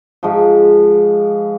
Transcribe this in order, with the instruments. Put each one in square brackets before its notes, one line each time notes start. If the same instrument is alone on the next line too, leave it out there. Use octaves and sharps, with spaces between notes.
[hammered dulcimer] G#2 F3